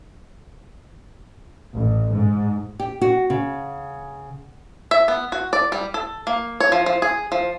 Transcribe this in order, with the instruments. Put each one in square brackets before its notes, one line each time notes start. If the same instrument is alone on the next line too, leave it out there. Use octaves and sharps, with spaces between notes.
[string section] A1
G#2
[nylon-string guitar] G4
F#4
C#3
[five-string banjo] E5
B3
F#4
D5
G3
A4
A#3
C#5
F3
F3
G#4
F3